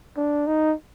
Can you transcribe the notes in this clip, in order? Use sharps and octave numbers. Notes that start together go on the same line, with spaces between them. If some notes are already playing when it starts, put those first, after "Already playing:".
D4
D#4